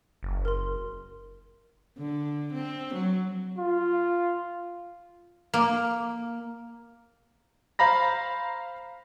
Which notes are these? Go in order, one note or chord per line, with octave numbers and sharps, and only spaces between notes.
F#1
A#4 C6
D3
C4
F#3
F4
A#3
C5 F5 A#5 B5 A#6